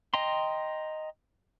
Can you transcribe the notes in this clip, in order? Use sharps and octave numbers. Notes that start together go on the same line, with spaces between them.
D#5 G5 A#5 C6